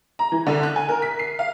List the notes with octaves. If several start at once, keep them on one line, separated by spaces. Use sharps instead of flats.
A#5
E3
D3
F#6
G#5
A#4
B6
C7
F5